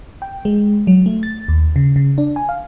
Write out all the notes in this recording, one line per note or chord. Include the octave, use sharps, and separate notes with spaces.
G5
G#3
F#3
A3
A6
D#2
C#3
C#3
D4
G#5
F5